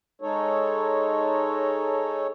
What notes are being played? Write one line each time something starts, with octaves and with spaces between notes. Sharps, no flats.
G#3 D#4 A4 C#5